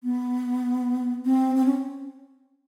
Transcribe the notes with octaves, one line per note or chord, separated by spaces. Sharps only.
B3
C4
C4
C#4